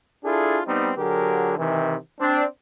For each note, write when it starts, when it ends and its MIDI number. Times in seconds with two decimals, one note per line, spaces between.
0.25 0.59 62
0.25 0.59 64
0.25 0.59 65
0.25 0.59 68
0.25 0.59 69
0.67 0.91 55
0.67 0.91 59
0.67 0.91 60
0.67 0.91 63
0.97 1.56 50
0.97 1.56 54
0.97 1.56 67
0.97 1.56 68
0.97 1.56 70
1.58 1.95 48
1.58 1.95 51
1.58 1.95 52
2.20 2.45 60
2.20 2.45 62